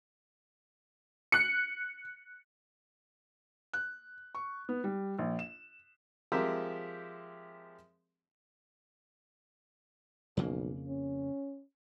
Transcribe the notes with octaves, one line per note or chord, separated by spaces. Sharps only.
F#6 C#7
F#6
C#6
B3
G3
A#1
E7
F3 G#3 C4 G4 A#4 E5
B1 F2 C#3 A#3
C#4